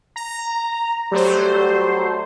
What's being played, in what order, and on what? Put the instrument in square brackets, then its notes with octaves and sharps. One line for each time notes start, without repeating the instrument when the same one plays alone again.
[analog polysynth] A#5
[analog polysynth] F#3 A3 C5 [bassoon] G3